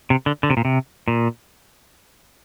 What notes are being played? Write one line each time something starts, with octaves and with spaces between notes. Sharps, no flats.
C3
D3
D3
C3
A#2
C3
A#2